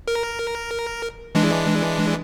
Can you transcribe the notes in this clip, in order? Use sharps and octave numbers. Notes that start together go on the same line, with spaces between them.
A#4
E3 G#3 D4